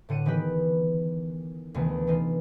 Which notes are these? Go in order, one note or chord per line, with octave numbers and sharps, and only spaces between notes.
A2 D3 F#5 D#7
D#3 E3 B3 D#4 G4 B4
D2 C3 D#3 E3 B3
E3 D#4 F4